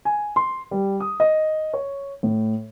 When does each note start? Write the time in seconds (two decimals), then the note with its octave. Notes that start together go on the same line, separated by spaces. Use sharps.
0.05 G#5
0.36 C6
0.71 G3
1.00 D#6
1.20 D#5
1.73 C#5
2.23 A2